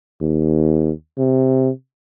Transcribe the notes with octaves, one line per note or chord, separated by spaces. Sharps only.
D#2
C3